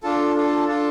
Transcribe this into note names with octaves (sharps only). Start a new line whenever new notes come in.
D4 F4 A4
D4 F4 A4
D4 F4 A4